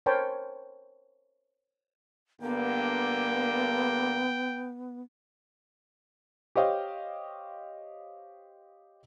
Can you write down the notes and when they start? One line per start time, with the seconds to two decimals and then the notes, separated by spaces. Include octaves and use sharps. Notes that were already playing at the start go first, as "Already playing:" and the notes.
0.06 A#4 C5 C#5 G5 A5 B5
2.42 G2 D3 A#3 B3 G5
6.55 G4 C5 C#5 D#5 F5 G5